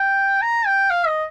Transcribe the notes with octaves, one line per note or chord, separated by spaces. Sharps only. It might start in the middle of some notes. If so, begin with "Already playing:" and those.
Already playing: G5
A#5
G5
F5
D#5